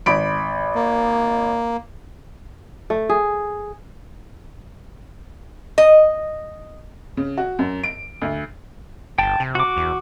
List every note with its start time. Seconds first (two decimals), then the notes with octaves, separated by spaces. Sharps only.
0.06 G#1 B5 D7
0.75 A#3
2.90 A3
3.09 G#4
5.78 D#5
7.17 C#3
7.38 F#4
7.59 F#2
7.84 D7
8.22 D2
9.19 G1 G5 A5
9.40 C3
9.55 F#4 D6
9.77 E2